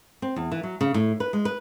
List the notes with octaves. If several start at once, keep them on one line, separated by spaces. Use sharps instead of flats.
C4
E2
E3
F#3
C#3
A2
B4
G#3
B4